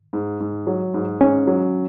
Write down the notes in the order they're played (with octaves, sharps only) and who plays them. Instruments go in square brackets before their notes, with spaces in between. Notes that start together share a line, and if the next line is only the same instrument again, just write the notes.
[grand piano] G#2
G#2
F#3
G#2
[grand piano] G#2 [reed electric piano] C#4
[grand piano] F#3